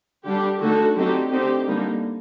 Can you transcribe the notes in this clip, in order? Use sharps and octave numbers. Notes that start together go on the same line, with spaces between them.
D3 G3 D4 G4
D3 A3 D#4 F#4 A4
D3 F#3 C4 D#4 G4
D3 A3 C4 D#4 G4
D3 G3 A#3 D#4